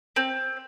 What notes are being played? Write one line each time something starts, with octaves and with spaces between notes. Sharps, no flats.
C4